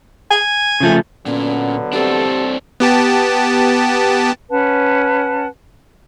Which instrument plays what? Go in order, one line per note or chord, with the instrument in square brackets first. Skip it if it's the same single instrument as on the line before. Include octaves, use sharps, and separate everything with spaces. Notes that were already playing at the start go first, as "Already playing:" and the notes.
[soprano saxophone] G#5
[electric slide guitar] C#3 F3 A3
[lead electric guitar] A#2 [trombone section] D3 F#3 B3 [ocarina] C#4
[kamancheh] A3 A4 [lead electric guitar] C4 D4 [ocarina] G4
[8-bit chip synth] B3 G4 A5
[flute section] C#4 B4 F#5 A5